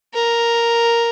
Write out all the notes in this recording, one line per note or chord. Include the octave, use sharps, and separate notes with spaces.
A#4